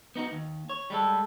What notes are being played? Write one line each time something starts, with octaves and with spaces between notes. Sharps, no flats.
B3 D#4 F#4
D#2
C#5
G3 G#3 A4